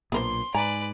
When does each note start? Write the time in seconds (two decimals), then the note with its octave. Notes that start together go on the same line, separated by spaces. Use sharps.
0.12 B1 A#2 B3 D4 A#4 C5 C6
0.54 G#2 B4 D5 G#5 A#5